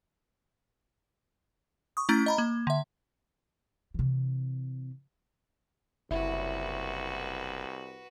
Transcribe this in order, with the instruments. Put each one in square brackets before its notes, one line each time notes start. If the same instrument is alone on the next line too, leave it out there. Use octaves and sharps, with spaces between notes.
[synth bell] C#6 D#6
A3 C#4 E4 A#5 A6
D#5 A#5 B5
A#3
D3 E5
[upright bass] C3 E3
[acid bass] F#1 [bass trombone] C2 [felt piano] E4 [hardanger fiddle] F#4 B4